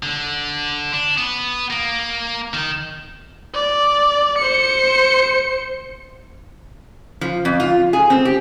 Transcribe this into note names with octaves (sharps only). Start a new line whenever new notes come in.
D3
D4
B3
A#3
D#3
D5
C5 C#7
F3
F2
F4
G#4
C4
G4